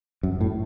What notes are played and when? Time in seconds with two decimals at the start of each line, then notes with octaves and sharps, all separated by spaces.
0.23 F#2
0.41 A2